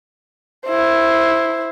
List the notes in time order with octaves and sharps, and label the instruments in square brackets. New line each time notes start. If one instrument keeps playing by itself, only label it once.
[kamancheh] E4 C5